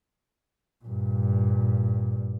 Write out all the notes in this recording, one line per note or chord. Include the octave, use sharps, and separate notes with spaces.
G2 A#2